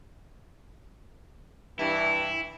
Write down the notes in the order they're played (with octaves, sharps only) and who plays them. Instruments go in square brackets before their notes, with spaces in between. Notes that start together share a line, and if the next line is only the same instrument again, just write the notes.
[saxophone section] G2 E3 [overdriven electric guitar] E4